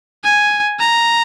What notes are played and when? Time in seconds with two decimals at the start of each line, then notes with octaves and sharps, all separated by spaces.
0.24 G#5
0.80 A#5